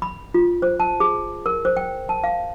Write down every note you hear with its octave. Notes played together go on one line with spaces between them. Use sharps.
B5
F4
C5
A5
G#4
A#4
C5
G5
A5
F5